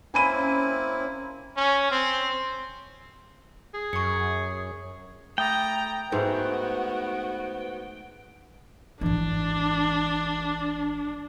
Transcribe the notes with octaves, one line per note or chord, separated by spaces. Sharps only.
A#3 C4 C#4 E4 G#5 B5 D#7
C#4
C4
G#4
F#2 C#6 C#7
A3 G5 A#5 D#6 A6
G#2 G#3 A3 B3 F#4 B4 C5
G#1 E3 D4